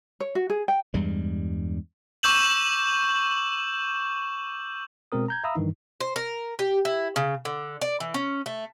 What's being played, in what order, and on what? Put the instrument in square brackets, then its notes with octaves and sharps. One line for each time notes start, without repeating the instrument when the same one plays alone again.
[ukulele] C#5
F#4
G#4
G5
[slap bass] E2 G2 G3 G#3
[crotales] C#6 D6 E6 G6 E7 F#7
[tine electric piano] B2 G#3 C4 A#4 D#6
A#5 G6 G#6
E5 F5 A#5 B5 D#6 E6
G2 D#3 E3 D#4
[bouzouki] C5
A#4
G4
E4
C#3
D3
D5
E3
C#4
A3